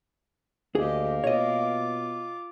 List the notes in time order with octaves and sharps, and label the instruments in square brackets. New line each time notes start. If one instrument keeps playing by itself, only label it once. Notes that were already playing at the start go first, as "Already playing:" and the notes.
[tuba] D2 [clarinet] A#3 [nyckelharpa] G4 D#5 [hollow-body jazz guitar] G#4
[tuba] B2 [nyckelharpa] F4 D6 [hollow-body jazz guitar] C#5 D#5